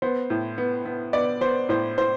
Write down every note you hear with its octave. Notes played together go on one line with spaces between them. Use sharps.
B3 C5
A2
B3
B3
B3 D5
B3 C5
A2 C5
A2 C5